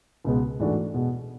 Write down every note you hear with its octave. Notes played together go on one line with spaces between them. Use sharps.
C#2 B2 G#3 B3
G#2 E3 A3 D4 F#4
B2 G#3 B3